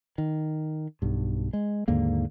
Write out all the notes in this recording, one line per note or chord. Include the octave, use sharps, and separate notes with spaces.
D#3
B1 G2
G#3
D#2 G#2 D3 A#3